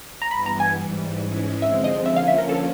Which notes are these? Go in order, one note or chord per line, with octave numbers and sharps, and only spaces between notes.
A#5
G2 E3 G3 B3 B5
A#5
G#5
G#2 E3 G3
G#2 E3 G#3 C#4 E4
D3 F3 G#3 C4 E5
D#5
D3 F3 A#3 C#4 F4 E5
F5
E5
A#4
A4